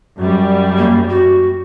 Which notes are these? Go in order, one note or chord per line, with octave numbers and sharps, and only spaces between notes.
F#2 G3
A#3
F#4